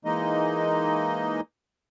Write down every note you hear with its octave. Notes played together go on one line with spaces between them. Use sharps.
E3 G#3 A#3 D#4 D#5